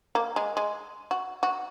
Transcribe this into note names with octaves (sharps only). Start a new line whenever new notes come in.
A#3
G#3
G#3
F#4
F#4